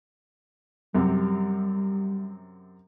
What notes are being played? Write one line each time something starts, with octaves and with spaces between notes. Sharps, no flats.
F#2 C3 G3